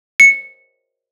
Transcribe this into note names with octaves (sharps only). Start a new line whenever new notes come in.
C#7